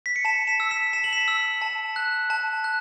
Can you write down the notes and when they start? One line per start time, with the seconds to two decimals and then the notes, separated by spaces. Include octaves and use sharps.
0.06 B6
0.16 C#7
0.25 A5 B6 E7
0.47 B6 E7
0.60 E6
0.71 B6 E7
0.93 A5 E7
1.04 F#7
1.13 B6 E7
1.28 E6
1.62 A5
1.96 F#6
2.30 A5
2.64 F#6